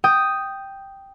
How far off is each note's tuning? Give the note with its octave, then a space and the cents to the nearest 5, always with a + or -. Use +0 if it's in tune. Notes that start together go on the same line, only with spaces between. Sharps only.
G5 +0 D#6 +0